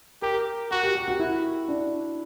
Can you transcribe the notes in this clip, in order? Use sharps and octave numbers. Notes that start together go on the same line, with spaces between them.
G4 A#4
F#4 A#4
G4
G4
F#4
E4
D4